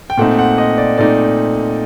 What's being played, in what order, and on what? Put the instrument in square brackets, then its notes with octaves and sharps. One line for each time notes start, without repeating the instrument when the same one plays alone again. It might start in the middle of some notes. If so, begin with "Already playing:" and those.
[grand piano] G5
A#2 A3 C4 D#4 F#5
F#5
D#5
D5
A#2 A3 C4 D#4 D5